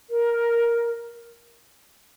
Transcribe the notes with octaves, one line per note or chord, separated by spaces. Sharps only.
A#4